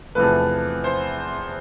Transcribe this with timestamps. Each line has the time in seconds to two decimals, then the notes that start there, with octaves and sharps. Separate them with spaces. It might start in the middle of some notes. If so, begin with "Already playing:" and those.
0.15 E2 C3 F3 A3 B4
0.84 C5